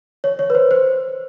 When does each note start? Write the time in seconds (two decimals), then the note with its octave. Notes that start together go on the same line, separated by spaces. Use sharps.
0.24 C#5
0.39 C#5
0.50 B4
0.55 C5
0.71 C5